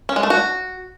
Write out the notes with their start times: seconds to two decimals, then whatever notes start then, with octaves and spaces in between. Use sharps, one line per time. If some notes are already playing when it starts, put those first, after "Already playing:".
0.09 C#4
0.16 G#3
0.23 A3
0.30 F#4